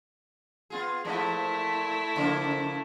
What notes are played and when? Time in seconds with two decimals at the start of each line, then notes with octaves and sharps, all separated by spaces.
0.70 B3 F4 G#4
1.05 A#2 E3 F3 A3 E4
2.16 C#3 F3 A#3